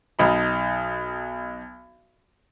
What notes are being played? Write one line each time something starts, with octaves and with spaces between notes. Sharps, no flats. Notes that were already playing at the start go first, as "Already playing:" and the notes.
B1 D#4 B5